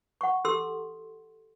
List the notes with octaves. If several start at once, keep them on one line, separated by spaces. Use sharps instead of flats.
F#5 C#6
G4 A4 C6 E6